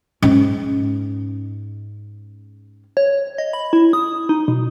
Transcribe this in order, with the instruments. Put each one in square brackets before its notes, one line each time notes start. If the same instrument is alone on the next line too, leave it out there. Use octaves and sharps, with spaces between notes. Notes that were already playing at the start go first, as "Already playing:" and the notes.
[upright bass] G#2 C#4
[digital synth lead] C#5
D#5
B5
E4
D#6
D#4
B2